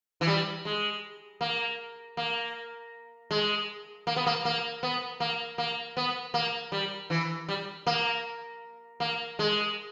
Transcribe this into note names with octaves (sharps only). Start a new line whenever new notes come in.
E3
G3
G#3
A#3
A#3
G#3
A#3
B3
A#3
A#3
B3
A#3
A#3
B3
A#3
G3
E3
G3
A#3
A#3
G#3